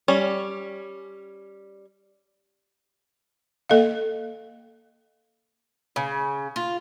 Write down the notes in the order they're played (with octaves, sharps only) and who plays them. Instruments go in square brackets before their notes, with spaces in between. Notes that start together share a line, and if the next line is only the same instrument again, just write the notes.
[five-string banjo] G3 C#4
[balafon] A#3 A4 D#5 F5
[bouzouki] C#3
F4